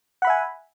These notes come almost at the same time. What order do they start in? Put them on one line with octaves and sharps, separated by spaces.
F#5 B5 E5 G#5